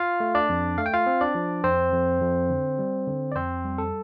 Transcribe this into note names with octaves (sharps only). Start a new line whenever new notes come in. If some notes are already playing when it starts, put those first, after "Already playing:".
Already playing: F4 F5
A3
D4 D5
F2
A3 F5
G5
F4 F5
C4
D4 D5
F3
F2 C4 C5
F2
F2
D3
G3
D3
D5
F2 C4 C5
G3
A4